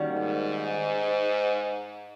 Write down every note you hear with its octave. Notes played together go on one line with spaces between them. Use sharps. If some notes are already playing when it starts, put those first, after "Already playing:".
Already playing: D#3 G3 A#3 C#4 F#4
G#2